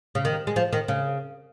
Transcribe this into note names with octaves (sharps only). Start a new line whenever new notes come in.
C#3
D#3
G#3
F3
D#3
C#3